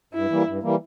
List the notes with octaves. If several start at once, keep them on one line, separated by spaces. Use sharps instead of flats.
G2 E4
E3 G3 A#3
G2
E3 G3 A#3